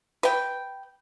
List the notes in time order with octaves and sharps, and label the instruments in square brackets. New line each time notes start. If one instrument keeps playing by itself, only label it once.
[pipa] B4 G5